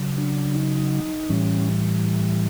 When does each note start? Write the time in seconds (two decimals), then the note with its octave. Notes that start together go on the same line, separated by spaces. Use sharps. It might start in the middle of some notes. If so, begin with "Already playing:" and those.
Already playing: C#3 F#3
0.18 D4
0.55 D#4
1.29 A2 E3 G3 C#4